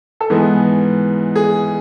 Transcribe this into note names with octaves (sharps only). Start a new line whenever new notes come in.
A4
G#2 E3 B3 G#4
G#4